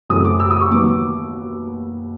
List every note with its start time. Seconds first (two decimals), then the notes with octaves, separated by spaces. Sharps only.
0.09 F#2 C#3 E3 A3 C4 D#6
0.25 D6
0.40 E6
0.50 D#6
0.60 C#6
0.71 D#2 D#3 F#3 B3 D6